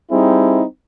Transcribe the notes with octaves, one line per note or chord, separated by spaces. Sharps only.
G3 C4 D#4 E4 G#4